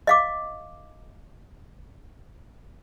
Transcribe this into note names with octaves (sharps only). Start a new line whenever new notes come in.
D#5 F5 D6